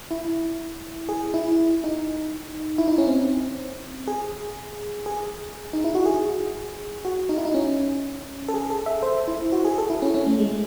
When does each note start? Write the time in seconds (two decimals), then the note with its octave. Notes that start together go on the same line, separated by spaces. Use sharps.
0.11 E4
1.09 G#4
1.34 E4
1.84 D#4
2.78 E4
2.88 D#4
2.98 C#4
3.07 C4
4.08 G#4
5.06 G#4
5.73 D#4
5.84 E4
5.95 F#4
6.06 G#4
7.05 F#4
7.29 D#4
7.38 E4
7.45 D#4
7.54 C#4
8.49 A4
8.54 G#4
8.70 A4
8.86 E5
9.03 C5
9.28 E4
9.52 F#4
9.65 G#4
9.78 A4
9.90 E4
10.02 C#4
10.15 C#4
10.27 A3
10.39 G#3